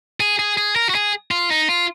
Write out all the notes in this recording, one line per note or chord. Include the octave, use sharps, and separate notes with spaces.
G#4
G#4
G#4
A#4
F#4
G#4
F4
D#4
F4